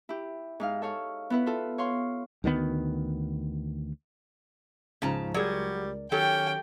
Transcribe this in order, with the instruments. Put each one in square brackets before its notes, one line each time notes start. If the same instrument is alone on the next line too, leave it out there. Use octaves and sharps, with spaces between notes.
[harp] E4 G4
G#2 D#4 F5
A4 C#5 F5
B3 E4 B4
F4 A4
C#5 F5 C6
[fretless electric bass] D2 D#3 F#3 B3
[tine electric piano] C#2 G#2 F3 [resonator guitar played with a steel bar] C#3 A5 A#5
[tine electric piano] C#2 A#4 D5 [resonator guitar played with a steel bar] F#3 G#4 [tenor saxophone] G3
[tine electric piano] D#3 [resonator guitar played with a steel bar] F#3 G4 A4 [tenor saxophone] C#4 [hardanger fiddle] G5